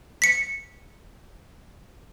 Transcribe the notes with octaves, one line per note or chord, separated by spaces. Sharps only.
B6 C#7